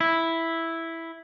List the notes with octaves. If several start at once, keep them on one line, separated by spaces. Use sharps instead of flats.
E4